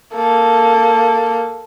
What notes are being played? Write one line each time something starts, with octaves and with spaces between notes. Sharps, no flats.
A#3 A4